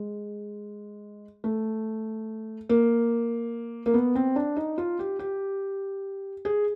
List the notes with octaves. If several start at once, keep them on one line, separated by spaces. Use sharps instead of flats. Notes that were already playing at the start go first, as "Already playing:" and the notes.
Already playing: G#3
A3
A#3
A#3
B3
C4
D4
D#4
F4
G4
G4
G#4